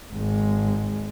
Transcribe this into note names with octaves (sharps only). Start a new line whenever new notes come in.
G#1 G#3